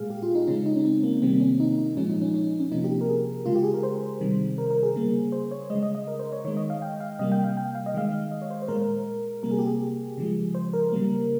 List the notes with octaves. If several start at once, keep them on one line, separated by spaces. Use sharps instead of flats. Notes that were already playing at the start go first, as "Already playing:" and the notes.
Already playing: A#2 G#3 G#4 F5
G4
F4
D#4
C#3 G#3 C#4
D#4
C#4
C4
A#3
C3 D#3 G3 A#3 C4
C#4
D#4
D#4
A#2 F3 G#3 C#4
D#4
C#4
C#4
C#4
C3 F3 A#3 D#4
G4
A#4
G#4
C#3 G#3 F4
G4
G#4
A#4
C5
C3 D#3 G3
A#4
A#4
G#4
C#3 G3 A#3
C5
C#5
C#3 G#3 D#5
D#5
D#5
A#4
C5
C#5
D#3 G#3 C#5
D#5
F5
G5
F5
C3 G3 A#3 D#5
G5
F5
G5
F5
D#5
D#3 G#3 F5
D#5
C#5
C5
C5
A#2 G#3 A#4
C3 G3 A#3 A#4
G#4
G4
G#4
C#3 F3 G#3
C5
A#4
C#3 G3 A#3